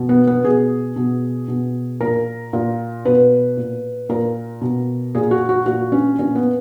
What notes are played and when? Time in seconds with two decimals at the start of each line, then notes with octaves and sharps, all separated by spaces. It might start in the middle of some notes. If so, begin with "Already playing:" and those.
Already playing: B2
0.09 B3
0.27 B3
0.45 B2 G#4
0.96 B2
1.48 B2
2.01 A#2 A#4
2.53 A#2
3.05 B2 B4
3.57 A#2
4.09 A#2 A#4
4.61 B2
5.15 A#2 G#4
5.31 F#4
5.49 F#4
5.66 A#2 F#4
5.92 C#4
6.19 A#2 C#4
6.35 B3